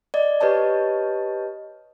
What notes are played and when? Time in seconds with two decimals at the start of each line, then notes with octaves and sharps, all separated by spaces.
0.14 D5 D#5
0.41 G4 B4 C#5 D#5 A5